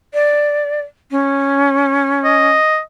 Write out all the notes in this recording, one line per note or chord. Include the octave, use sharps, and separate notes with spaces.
D5
C#4
D#5